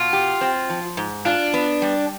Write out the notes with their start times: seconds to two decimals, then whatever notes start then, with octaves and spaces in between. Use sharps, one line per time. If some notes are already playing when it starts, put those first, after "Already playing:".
Already playing: B2 F4
0.13 G4
0.41 C4
0.70 F3
0.97 G#2
1.25 D4 F4
1.54 B3
1.82 G3